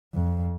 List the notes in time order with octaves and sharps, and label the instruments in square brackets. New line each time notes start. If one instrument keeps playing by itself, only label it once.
[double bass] F2